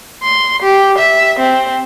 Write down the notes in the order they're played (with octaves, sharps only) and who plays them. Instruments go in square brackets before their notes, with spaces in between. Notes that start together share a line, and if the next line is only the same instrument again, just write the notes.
[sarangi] C6
G4
E5
C4